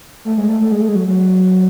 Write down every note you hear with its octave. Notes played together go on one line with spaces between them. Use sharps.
A3
G#3
A3
A3
G#3
A3
G#3
F#3
F#3